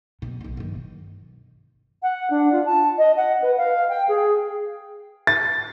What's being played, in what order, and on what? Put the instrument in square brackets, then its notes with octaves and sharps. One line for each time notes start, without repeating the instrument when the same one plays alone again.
[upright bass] B2
B1 B2
G1 D#3
[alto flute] F#5
D4
F4
A5
D#5
F#5
B4
F5
G5
G#4
[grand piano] A6